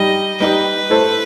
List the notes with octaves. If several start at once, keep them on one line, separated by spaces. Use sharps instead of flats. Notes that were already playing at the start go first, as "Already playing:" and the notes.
Already playing: G3 D#4 G4 D#5
G3 D#4 G4 B4
A3 E4 A4 C5